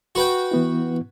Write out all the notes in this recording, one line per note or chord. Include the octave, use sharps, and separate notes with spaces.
F#4 B4 G5
E3 B3 E4